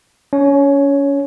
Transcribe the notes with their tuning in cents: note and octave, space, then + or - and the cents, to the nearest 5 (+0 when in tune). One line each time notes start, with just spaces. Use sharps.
C#4 +30 C#5 +5